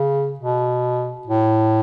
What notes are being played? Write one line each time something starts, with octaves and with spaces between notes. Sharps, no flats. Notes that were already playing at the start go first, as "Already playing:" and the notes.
Already playing: C#3
B2
A2